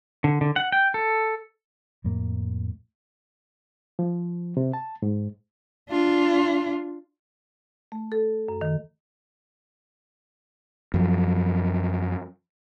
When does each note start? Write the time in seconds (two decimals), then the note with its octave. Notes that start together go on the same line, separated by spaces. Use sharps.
0.24 D3
0.41 D3
0.56 F#5
0.72 G5
0.94 A4
2.04 F2 A2 A#3
3.99 F3
4.57 C3
4.73 A5
5.02 G#2
5.89 D4 F4
7.92 A3
8.12 A4
8.48 F#2
8.61 D#3
10.94 F#2 F3